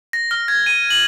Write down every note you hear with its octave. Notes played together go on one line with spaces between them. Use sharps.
A#6
F6
G#6
D#7
F#7